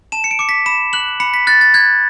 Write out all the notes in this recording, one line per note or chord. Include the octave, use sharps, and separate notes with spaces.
A5 E7
C#7
D7
D6 C#7
B6
B5 E7
F#6 F#7
B5 C#7
B6
F#6 A6
A6
F#6 G#6